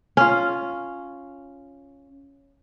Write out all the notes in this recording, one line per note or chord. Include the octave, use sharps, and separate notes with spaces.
C#4 F4